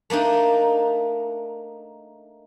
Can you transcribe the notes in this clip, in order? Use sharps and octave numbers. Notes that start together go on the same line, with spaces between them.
A3 A#3 D4 D#4